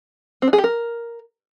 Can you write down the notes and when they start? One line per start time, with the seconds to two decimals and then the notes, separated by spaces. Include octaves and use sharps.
0.42 C4
0.48 D4
0.53 G#4
0.58 G4
0.64 A#4